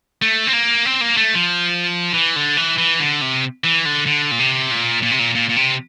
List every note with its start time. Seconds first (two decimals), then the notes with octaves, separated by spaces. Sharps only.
0.22 A3
0.47 C4
0.53 A#3
0.85 C4
1.01 A#3
1.17 A3
1.34 F3
2.14 E3
2.36 D3
2.57 E3
2.78 E3
3.00 D3
3.21 C3
3.64 E3
3.85 D3
4.06 D3
4.31 A#2
4.39 C3
4.71 A#2
5.03 A#2
5.11 C3
5.19 A#2
5.35 A#2
5.49 A#2
5.56 C3